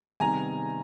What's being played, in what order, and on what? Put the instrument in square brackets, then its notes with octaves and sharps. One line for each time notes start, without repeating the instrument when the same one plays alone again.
[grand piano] C3 D#3 G3 B3 D#4 [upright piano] G#5 A#5